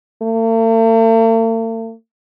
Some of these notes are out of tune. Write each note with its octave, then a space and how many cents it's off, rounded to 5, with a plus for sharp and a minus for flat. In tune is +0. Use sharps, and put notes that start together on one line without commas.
A3 +45